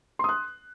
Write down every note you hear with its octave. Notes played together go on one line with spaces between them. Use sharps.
C6 D#6 F#6